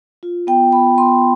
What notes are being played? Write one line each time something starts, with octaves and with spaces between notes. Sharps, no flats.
F4
B3 G5
B3 B5
B3 C6